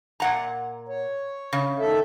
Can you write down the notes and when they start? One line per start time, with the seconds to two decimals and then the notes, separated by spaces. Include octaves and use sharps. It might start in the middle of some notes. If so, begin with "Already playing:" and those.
0.20 A#2 F#5 A#5
0.89 C#5
1.53 C#3
1.79 D#3 A4 E5